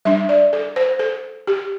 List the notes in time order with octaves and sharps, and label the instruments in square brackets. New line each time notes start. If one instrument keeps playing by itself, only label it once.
[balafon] G3 D4 E5
D5
A4
C5
A4
G4